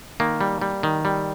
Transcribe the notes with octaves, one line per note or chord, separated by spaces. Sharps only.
D#3 A#3
G3
G3
D#3
G3